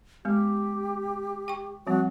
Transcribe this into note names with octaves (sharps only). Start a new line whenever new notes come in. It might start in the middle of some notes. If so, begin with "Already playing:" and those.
G#3 B3 G4
G5 C#6
F3 G3 C4 F#4